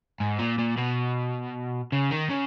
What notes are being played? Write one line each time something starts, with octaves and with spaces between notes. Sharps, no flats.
G#2
A#2
A#2
B2
C#3
D#3
C#3